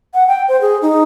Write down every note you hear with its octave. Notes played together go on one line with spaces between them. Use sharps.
F#5
G5
C5
G#4
D#4